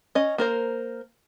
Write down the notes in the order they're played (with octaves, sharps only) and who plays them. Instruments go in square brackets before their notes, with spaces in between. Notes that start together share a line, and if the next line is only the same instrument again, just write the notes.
[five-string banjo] C#4 D#5
A#3 A#4 C5